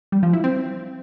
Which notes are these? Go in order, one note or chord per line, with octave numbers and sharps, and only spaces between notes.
G3
F3
E4
C4